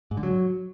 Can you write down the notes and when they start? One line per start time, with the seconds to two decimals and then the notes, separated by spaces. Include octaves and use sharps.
0.11 G#2
0.17 D3
0.23 F#3